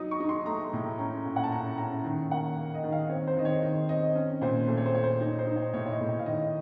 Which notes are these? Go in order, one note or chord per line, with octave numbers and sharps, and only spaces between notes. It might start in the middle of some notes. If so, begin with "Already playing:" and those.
Already playing: F#3 D#4 D#6
C#6
D#4
C6
A3 A#5
C6
A2
A#5
C#4 A#5
A#2
F#5
A5
C#4 A#5
C#4 A#5
D#3 A#5
A#3 F#5
A#3
D#5
D#3
F5
C4 C#5
C5
D#3 D#5
C#5
D#3 D#5
C4 D#5
C#4
A#2 C5
A3 C5
C#5
C5
A#2 C#5
C5
D#4 C#5
C5
D#4
C#5
A2 C#5
C#5
D#5
A2
C#5
F5
D#3 D#5